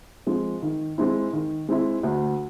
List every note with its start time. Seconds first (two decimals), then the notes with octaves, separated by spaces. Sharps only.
0.27 F3 G#3 C4
0.62 D#3
0.98 G#3 C4 E4
1.33 D#3
1.69 G#3 C4 E4
2.03 D2